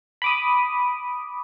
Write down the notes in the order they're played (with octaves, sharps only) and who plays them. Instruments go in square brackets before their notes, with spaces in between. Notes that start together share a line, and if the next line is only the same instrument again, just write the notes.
[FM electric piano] B5 D6 D#6